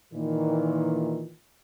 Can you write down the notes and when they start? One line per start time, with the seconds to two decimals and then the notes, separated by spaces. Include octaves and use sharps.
0.13 A#2 D#3 E3